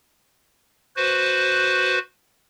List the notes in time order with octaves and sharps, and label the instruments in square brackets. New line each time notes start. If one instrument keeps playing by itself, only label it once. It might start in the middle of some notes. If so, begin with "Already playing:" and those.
[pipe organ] F#4 B4 C5